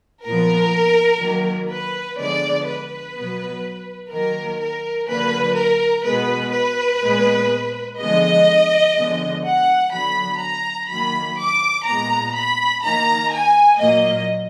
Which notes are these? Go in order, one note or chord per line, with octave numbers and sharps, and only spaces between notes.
A#2 F3 B3 A#4
D#3 F#3 A#3
B4
D3 F3 G#3 B3 D5
B4
B2 F#3 B3
D#3 F#3 A#3 A#4
A#4
D3 F#3 A#3 B4
A#4
B2 G#3 B3 B4
B4
A#2 G#3 B3
D3 F3 G#3 B3 D#5
D3 F3 G#3 B3
F#5
D3 F#3 B3 B5
A#5
D#3 F#3 A#3 B5
D6
A#2 G#3 B3 A#5
B5
D#3 A#3 A#5
G#5
A#2 F#3 A#3 D#5